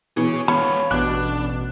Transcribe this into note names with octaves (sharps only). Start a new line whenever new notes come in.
B2 E3 G#4 C#5
B3 C#5 F5 B5
A1 B2 D4 F#6